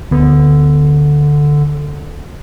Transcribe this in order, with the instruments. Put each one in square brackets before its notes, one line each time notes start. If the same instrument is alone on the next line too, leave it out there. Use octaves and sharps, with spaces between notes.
[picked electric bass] D2 B3 [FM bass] D3